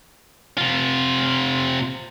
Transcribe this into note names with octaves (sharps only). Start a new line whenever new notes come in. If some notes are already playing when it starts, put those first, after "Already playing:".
C3 F4